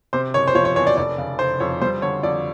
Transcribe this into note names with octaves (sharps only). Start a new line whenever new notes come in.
C3 C5
F#1 C#5
C5
F3 C#5
C#5
E2 C#5
D5
F1 D5
C#3
F1 C5
F2 C#5
G3 C5
D3 C#5
F2 D5